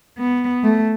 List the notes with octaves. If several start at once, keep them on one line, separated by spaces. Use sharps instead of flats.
B3
A3